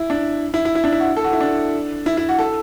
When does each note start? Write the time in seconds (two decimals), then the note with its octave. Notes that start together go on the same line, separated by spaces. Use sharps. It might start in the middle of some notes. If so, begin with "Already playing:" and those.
Already playing: E4
0.10 D4
0.54 E4
0.65 E4
0.75 E4
0.84 D4
0.93 E4
1.00 F#4
1.16 A4
1.24 F#4
1.33 E4
1.40 D4
2.06 E4
2.17 E4
2.29 F#4
2.39 A4